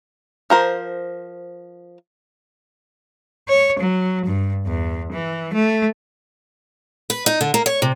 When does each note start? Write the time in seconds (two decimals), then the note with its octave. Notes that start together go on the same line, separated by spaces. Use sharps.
0.50 F3 A#4 C5
3.49 C#5
3.79 F#3
4.26 G2
4.66 E2
5.12 E3
5.54 A3
7.10 B4
7.26 D#4
7.41 D3
7.54 A#3
7.66 C#5
7.82 C3